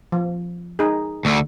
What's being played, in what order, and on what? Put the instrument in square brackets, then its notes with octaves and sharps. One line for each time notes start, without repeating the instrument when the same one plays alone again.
[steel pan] F3
D#4 G#4
[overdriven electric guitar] D2 D3